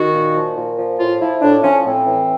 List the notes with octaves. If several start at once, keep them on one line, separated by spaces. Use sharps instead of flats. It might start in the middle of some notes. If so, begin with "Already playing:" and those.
Already playing: D#3 F#4
A#2
F3
A#2
F3
A2 F4
F3 E4
A2 D4
F3 C#4
A2 C4
E3